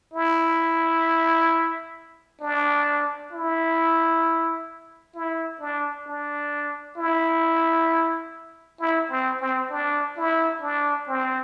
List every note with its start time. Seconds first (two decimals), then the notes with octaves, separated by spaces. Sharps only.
0.14 E4
2.41 D4
3.33 E4
5.15 E4
5.60 D4
6.07 D4
6.98 E4
8.80 E4
9.10 C4
9.41 C4
9.71 D4
10.17 E4
10.62 D4
11.08 C4